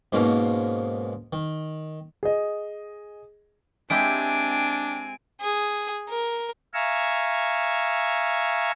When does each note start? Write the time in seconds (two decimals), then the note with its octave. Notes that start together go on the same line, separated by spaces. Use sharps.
0.13 G#2 B2 A#3 C#4
1.33 D#3
2.23 G#4 D#5
3.90 G#3 C4 D4 E4 G4 G#5 D7
5.41 G#4
6.09 A#4
6.74 E5 F5 G#5 A#5 C#6 E6